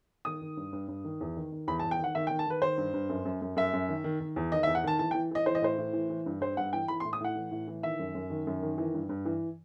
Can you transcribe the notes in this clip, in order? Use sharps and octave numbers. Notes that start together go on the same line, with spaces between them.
D#3 D#6
D#3
G2
G2
G2
D#3
E2
D#3
D#3
E2 B5
A5
E2
G5
D#3 F#5
D#3 E5
G5
D#3
A5
D#3 B4
D#3 C5
G2
G2
F#2
F#2
F#2
F#2 E5
F#2
D#3
D#3
D#3
E2
D#3 D#5
E5
E2
F#5
D#3 A5
E3 A5
G5
E3
E3 D#5
E3 C5
D#5
A2 C5
A2
E3
E3
G2
G2 C5
G2 F#5
E3 G5
E3 B5
C6
A2
D#6
A2 F#5
E3
A2
E3
D#3 E5
F#2
F#2
D#3
F#2
D#3
E3
G2
G2
E3